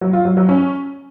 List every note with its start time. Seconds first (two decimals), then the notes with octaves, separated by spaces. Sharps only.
0.01 F#3
0.13 F4
0.25 F#3
0.37 F#3
0.49 C#4